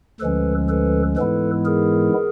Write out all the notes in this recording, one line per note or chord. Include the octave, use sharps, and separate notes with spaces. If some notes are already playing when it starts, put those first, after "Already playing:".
D2 D3 F3 G#3 C#4 A4 B4
A4 B4
G#2 E3 G#3 B3 E4 A4 B4
G#4 A#4